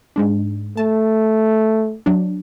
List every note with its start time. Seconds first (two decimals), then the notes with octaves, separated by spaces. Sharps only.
0.16 G#2 G#3 D4
0.77 A3 A5
2.06 F#3 D4